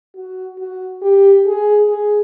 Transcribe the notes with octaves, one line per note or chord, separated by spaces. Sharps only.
F#4
F#4
G4
G#4
G#4